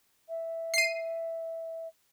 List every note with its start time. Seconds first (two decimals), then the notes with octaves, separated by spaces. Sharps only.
0.29 E5
0.74 C7 D#7